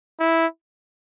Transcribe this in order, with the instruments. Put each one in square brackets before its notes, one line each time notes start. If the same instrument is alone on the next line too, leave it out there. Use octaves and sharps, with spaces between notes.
[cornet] E4